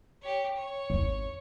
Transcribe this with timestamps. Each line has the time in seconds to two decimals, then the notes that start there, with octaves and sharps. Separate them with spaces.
0.22 G4 C#5
0.56 C#5
0.90 G#1 E2